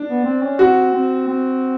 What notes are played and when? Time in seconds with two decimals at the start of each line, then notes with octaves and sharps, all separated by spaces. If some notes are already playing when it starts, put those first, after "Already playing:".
Already playing: D4
0.08 B3
0.24 C4
0.43 C#4
0.59 C4 F#4
0.93 C4
1.28 C4